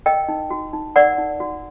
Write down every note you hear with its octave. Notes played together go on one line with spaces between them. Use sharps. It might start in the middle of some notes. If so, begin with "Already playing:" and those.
A#4 D#5 G5
D#4
F#4
D#4
A#4 D5 F#5
D#4
F#4